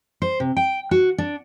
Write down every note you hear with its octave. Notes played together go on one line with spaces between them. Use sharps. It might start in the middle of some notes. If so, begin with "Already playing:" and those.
C5
C3
G5
F#4
D4